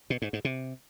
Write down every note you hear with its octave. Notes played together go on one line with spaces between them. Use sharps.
B2
G#2
G#2
C3